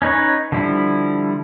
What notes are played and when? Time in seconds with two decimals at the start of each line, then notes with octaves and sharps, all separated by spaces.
0.02 C#4 D#4 B4 C#5
0.52 D3 F3 G3 E4